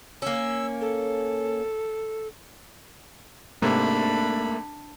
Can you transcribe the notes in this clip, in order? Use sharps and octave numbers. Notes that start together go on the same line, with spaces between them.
A#3 C#4 E6
A4
G#2 C3 A3 A#3 D4 B5